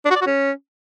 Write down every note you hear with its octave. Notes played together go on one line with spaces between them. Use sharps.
D4
F#4
D5
F#4
C#4